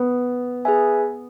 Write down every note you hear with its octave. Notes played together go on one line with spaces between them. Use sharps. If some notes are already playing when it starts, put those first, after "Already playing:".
Already playing: B3
G#4 B4 E5 G#5